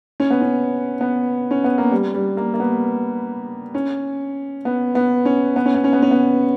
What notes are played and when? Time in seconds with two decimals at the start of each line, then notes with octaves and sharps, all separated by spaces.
0.20 C#4
0.30 B3
0.42 C#4
1.01 B3
1.51 C#4
1.64 B3
1.78 A#3
1.91 G3
2.14 G3
2.37 A#3
2.54 A#3
2.60 B3
3.74 C#4
4.65 B3
4.95 B3
5.25 C#4
5.56 B3
5.66 C#4
5.74 B3
5.84 C#4
5.93 B3
6.02 C#4
6.11 B3